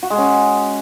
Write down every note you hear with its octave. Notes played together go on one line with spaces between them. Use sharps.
F#4
G#3
C#4